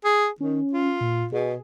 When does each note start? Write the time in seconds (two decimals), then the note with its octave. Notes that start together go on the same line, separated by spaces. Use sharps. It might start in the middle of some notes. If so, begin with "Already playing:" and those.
0.04 G#4
0.40 D#3 C#4
0.73 F4
1.01 A#2
1.32 B2 G#4